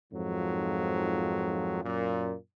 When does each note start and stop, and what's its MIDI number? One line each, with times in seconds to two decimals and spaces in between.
0.12 1.83 41
0.12 1.83 44
0.12 1.83 51
0.12 1.83 53
0.12 1.83 54
1.83 2.33 42
1.83 2.33 46